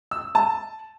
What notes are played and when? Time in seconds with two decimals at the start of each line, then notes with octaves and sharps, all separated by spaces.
0.11 E6
0.35 A5